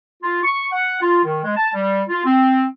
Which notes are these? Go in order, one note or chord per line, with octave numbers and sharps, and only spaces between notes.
F4
C#6
F#5
F4
D#3
G#3
A5
G3
F4
C4